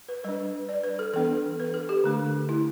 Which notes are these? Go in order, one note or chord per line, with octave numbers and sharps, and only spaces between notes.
B4
G3 D4 B4
D5
B4
A4
E3 B3 D4 A4
B4
A4
G4
D3 A3 D4
E4